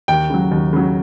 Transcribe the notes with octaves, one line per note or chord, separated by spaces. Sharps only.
D#2 G5
C#3 F#3
D#2
C#3 F#3